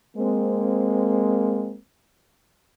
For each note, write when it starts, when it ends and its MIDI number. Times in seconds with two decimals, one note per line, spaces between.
0.17 1.77 56
0.17 1.77 58
0.17 1.77 60